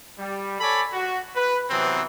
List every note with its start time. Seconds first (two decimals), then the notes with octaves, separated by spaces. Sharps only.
0.19 G3
0.61 A4 C#5 D5 G#5 B5
0.93 F#4
1.36 B4
1.70 C3 E3 F#3 B3 C4